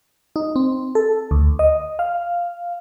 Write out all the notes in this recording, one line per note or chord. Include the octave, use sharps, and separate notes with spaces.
D#4
C4
A4
D2
D#5
F5